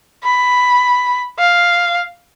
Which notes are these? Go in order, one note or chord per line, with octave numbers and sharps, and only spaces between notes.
B5
F5